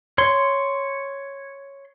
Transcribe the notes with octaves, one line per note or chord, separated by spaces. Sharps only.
C#5 C6